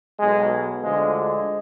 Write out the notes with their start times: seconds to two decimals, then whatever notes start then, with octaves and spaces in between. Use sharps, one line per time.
0.20 B1 B2 G#3
0.83 D2 D3 F3 G#3
1.15 G#3